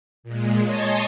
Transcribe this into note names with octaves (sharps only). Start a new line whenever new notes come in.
A#2 G#3
C#5 D#5 G#5 A5 C6